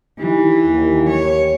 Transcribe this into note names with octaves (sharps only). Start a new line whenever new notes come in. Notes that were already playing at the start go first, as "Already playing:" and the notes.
E3 D#4 G4
D#2
C#5